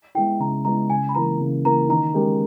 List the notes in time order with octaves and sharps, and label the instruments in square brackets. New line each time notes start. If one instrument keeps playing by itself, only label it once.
[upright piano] G#3 B3 E4 [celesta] G5
[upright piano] C#3 [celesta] A#5
[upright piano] G#3 B3 E4 [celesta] A#5
[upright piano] C#3 [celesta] G#5
[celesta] B5
[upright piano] E3 A#3 [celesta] A#5
[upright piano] C#3
[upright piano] E3 A#3 [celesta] A#5
[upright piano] D#3 [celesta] A#5
[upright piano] G#3 C#4 G4 A#4